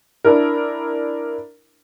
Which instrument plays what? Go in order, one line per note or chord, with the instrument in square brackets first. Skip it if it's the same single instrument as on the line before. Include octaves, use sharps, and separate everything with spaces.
[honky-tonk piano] D4 E4 A#4